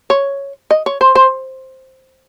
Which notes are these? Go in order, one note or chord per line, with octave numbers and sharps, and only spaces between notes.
C#5
D#5
C#5
C5
C5